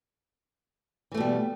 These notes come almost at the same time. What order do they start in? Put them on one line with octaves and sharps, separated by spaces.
E3 A3 B2 G3